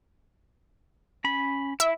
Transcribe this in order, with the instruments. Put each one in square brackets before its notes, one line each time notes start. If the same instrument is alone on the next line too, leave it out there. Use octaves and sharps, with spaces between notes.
[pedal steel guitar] C#4 B5
[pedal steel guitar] E4 [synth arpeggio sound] E5